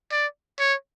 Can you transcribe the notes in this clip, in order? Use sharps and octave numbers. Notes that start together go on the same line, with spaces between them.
D5
C#5